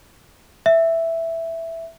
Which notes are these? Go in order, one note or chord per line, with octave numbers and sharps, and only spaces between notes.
E5